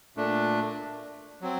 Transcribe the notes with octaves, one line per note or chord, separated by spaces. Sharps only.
A#2 A3 D4
F#3 C4